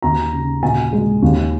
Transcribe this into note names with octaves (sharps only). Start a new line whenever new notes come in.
D#2 A#5
C#3
A#2 G#5
G#3
D#2